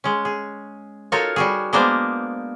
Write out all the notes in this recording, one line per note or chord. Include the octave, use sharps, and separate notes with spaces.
G#3 C#4
G#4
D#4 F4 F#4 A4 A#4 C#5
G3 F#4 G#4
G#3 A#3 B3 D4 A#4 C5